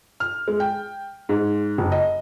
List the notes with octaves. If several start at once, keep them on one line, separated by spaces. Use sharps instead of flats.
F6
G#3
G5
G#2
F#1
D#5